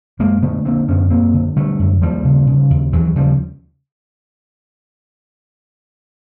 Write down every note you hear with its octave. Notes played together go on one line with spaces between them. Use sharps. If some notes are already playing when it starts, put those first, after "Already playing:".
F#2 G#3 A#3
D3 A3 B3
D3 A#3 C4
F#2 B3 C#4
F#2 A#3 C4
D3
D3 G3 A3
F#2
D#2 F3 G3
C#3
C#3
D#2
D#2 E3 F#3
C#3 F3 G3